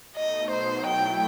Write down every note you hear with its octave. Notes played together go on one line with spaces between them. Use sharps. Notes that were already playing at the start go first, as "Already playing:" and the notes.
B2 A3 D#4 D#5
B2 F#3 B3 D#4 C5
F#3 A3 E4 G5